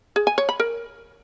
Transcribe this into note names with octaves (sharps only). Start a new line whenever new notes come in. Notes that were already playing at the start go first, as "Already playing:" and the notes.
G#4
G#5
C#5
B5
A#4